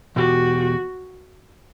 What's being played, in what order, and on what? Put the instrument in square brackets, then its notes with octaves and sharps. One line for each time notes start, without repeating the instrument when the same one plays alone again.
[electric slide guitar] E2 B2 G4 [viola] F#4